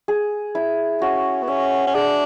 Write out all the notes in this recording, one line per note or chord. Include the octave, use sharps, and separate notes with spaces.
G#4
E4
C#4 F#4
B3
C#4 E5
C#4
D4 G#4